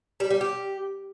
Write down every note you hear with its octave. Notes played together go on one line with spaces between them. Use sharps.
G3
G3
G4